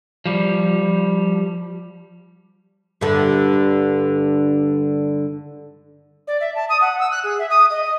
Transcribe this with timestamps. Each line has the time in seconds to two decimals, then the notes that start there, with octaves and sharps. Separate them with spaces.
0.25 F3 G3
3.01 G2 D3
6.27 D5
6.40 E5
6.55 A5
6.69 D#6
6.81 F#5
7.00 E6
7.11 F#6
7.24 G#4
7.39 E5
7.50 D#6
7.70 D#5
7.84 D#5